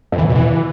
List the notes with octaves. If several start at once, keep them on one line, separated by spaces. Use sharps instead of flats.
F2
E3
E2
B2
E3